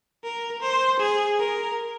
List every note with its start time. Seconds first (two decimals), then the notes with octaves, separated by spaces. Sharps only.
0.23 A#4
0.62 C5
1.00 G#4
1.39 A#4